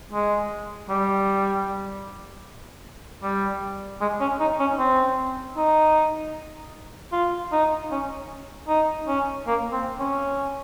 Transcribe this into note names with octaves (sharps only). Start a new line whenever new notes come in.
G#3
G3
G3
G#3
C#4
D#4
C#4
C4
D#4
F4
D#4
C#4
D#4
C#4
A#3
C4
C#4